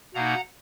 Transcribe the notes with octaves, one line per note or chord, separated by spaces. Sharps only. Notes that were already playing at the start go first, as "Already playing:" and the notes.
B2 A#3 D#4 F#5 A#5